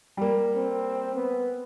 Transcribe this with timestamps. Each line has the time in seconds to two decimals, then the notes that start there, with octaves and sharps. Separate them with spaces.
0.17 G3 A#3
0.55 C4
1.15 B3